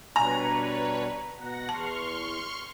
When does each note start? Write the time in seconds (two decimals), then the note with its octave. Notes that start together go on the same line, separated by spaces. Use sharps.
0.16 B2 G3 D4 B4 C#5 G#5 A#5
1.37 B2 F#5 A#6
1.69 E2 A5 C6 C#6 F6